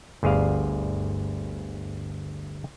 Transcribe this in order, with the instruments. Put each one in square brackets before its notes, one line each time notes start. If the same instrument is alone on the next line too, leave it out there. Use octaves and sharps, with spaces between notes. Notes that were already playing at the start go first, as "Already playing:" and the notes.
[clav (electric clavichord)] G1 D2 G#4 D5 F5